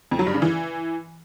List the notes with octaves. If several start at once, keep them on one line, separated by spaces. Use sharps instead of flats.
F2
F#3
G2
C#3
E3